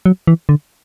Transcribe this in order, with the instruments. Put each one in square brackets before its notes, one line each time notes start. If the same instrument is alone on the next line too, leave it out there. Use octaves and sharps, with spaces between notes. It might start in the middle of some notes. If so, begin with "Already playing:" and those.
[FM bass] F#3
E3
D3